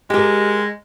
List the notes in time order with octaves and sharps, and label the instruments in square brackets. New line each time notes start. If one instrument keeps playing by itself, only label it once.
[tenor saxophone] G#3 [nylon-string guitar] G4 A#4